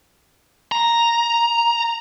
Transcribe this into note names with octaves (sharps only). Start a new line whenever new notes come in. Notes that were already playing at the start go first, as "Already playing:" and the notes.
A#5